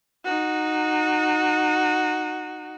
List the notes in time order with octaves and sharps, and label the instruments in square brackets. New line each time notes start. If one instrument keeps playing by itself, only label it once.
[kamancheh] D#4 F#4